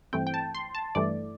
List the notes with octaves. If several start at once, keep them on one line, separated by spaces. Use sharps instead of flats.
G2 E3 A3 C4 G5
G5
A5
C6
A5
G2 E3 A3 D5